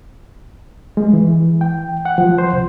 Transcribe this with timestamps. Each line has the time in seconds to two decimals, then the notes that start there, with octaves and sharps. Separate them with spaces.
0.97 G#3
1.13 E3
1.61 G5
2.05 F#5
2.18 F3
2.38 C5
2.53 C2